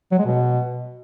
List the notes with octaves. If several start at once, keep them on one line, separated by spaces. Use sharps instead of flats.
F#3
G#3
B2